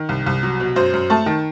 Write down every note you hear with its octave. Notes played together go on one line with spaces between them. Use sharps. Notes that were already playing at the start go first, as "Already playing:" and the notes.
Already playing: D#3
C2
C2
F#3
B2
F#2 C5
F#2
A3 A5
D#3